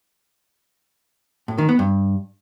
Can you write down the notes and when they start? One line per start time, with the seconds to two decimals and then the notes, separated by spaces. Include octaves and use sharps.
1.48 A2
1.58 D#3
1.69 B3
1.79 G2